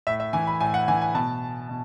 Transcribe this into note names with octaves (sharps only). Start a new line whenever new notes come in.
A2 E5
E5
E3 G#5
B5
A2 G#5
F#5
E3 G#5
G#5
B2 A5
B2